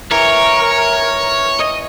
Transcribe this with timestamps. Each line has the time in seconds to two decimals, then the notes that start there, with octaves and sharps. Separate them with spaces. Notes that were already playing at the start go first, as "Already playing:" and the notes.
0.11 E3 A#4 C#5
1.60 D#5